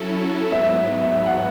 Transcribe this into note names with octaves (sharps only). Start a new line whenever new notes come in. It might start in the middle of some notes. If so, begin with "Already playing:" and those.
Already playing: F#3 C#4 E4 A4
G#2 F#3 B3 E5
E5
F#5